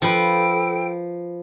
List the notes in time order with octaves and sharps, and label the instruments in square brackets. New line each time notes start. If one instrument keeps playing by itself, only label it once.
[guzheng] F3 B4 [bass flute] A4 [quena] G5